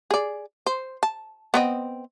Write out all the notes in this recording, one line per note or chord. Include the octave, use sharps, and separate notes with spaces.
G#4 D5
C5
A5
B3 C4 D#5